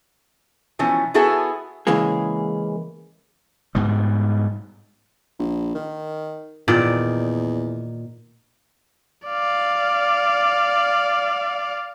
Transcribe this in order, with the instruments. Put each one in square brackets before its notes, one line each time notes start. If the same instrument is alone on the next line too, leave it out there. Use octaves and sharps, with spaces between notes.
[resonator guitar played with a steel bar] B2 E3 F3 C#4
B3 E4 F#4 G#4 A4 E5
[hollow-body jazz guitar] C#3 E3 G#3 A#3 G#4
[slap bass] G#2 B2 G3
[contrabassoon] A#1
D#3
[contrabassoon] E2 [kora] A#2 D#3 D5
[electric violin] D5 F5